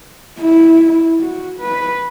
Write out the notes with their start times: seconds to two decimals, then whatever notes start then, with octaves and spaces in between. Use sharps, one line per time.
0.40 E4
1.20 F#4
1.60 B4